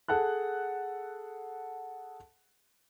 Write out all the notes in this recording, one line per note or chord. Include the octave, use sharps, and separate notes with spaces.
G#4 A4 F#5 A5 F#6